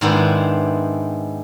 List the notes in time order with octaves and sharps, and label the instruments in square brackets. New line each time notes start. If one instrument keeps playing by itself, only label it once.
[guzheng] G#2 D#3 B3 C4 D4 E4